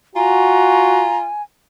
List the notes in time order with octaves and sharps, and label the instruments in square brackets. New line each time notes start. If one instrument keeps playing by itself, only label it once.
[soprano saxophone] F4 [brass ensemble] F#4 [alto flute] G#5 [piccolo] A#5